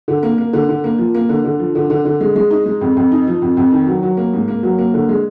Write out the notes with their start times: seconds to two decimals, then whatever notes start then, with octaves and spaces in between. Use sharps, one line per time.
0.08 D3
0.23 A#3
0.38 A#3
0.53 D3
0.69 D3
0.84 A#3
0.99 F3
1.15 A#3
1.29 D3
1.45 D3
1.59 F3
1.75 D3
1.90 D3
2.05 D3
2.21 G#3
2.36 G#3
2.51 D#4
2.66 G#3
2.81 F2
2.97 F2
3.12 D#4
3.27 F3
3.42 F2
3.57 F2
3.72 D#3
3.87 F#3
4.03 F#3
4.17 A#3
4.33 G#2
4.48 A#3
4.63 F#3
4.78 A#3
4.94 D3
5.09 G#3